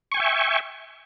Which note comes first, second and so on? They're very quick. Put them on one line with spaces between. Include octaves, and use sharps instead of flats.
C#6 G#5 G5 E5